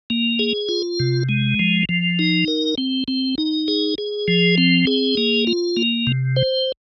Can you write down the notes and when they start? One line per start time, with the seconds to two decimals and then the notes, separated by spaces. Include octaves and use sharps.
0.10 A#3
0.39 G#4
0.69 F4
1.00 C3
1.29 G#3
1.59 F3
1.89 F3
2.19 D#4
2.48 A#4
2.78 C4
3.08 C4
3.38 D#4
3.68 G#4
3.98 G#4
4.28 F3
4.58 C4
4.87 G#4
5.17 A#3
5.47 F4
5.77 A#3
6.07 C3
6.36 C5